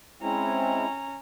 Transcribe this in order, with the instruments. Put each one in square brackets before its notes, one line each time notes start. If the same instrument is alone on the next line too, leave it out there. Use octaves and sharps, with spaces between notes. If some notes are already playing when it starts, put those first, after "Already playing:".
[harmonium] G#3 C4 E4 [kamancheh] C#4 A#5